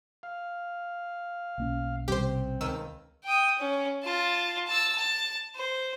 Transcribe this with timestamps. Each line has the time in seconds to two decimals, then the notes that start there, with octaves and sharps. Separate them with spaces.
0.23 F5
1.58 B1 A#3 C#4
2.08 C3 G3 C4 G4 C5
2.61 C#2 D#3 E6
3.24 G5 D#6
3.59 C#4
4.03 F4 A5
4.67 A5 E6
4.97 A5
5.55 C5